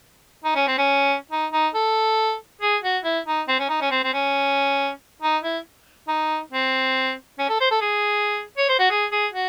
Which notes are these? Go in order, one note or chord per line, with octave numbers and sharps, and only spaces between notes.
D#4
C#4
C4
C#4
D#4
D#4
A4
G#4
F#4
E4
D#4
C4
C#4
D#4
C#4
C4
C4
C#4
D#4
E4
D#4
C4
C#4
A4
C5
A4
G#4
C#5
C5
F#4
G#4
G#4
F#4